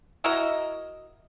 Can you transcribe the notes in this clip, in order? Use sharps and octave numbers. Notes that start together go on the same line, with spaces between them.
E4 F#4 A#4 D#5